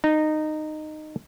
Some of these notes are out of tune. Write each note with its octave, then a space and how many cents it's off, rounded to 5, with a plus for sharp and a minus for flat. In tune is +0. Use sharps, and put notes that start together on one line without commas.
D#4 -15